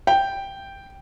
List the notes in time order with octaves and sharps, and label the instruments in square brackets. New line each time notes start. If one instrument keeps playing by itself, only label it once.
[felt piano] G5